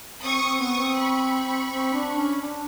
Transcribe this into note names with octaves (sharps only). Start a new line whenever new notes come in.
C4 C#6 D#6
C4
B3 C#6 D#6
C4
B5 C#6
C4
D4
C#4
D4